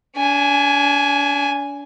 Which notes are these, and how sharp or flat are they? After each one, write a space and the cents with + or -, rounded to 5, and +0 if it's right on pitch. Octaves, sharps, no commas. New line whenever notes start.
D4 -40 G#5 +0